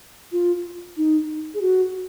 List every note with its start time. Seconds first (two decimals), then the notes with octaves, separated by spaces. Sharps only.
0.32 F4
0.97 D#4
1.54 G#4
1.61 F#4